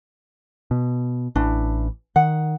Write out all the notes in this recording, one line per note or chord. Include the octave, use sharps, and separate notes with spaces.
B2
A1 D4 E4
D#3 F#5